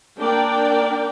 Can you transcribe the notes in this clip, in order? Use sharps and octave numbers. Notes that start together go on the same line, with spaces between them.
A#3 D4 A#4 D5 G5